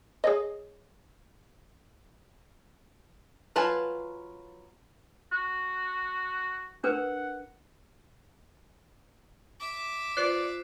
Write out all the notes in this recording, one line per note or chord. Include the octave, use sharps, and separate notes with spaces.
G#4 C#5 D#5
F#3 F4 B4 G#5 A5
F#4
D4 A#4 B4 F#5
E5 D6
F4 C5 D5 F#6 C7